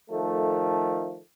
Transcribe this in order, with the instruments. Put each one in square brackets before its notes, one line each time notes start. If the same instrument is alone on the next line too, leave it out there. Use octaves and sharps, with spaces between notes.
[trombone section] D#3 F3 A3